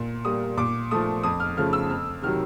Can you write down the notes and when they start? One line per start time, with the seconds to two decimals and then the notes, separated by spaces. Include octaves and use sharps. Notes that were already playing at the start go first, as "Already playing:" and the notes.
Already playing: A#2
0.25 G3 A#3 D#6
0.57 A#2 D6
0.91 F3 A3 D#6
1.23 F2 D#6
1.40 F6
1.57 C#3 F3 A3 F6
1.73 E6
1.90 F2 F6
2.22 C3 D#3 F#3 F6